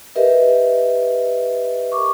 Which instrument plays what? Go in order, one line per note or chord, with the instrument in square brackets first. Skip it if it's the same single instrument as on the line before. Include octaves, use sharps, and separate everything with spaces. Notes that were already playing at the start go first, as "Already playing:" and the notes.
[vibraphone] G4 A#4 B4 D#5 E5
C#6 D6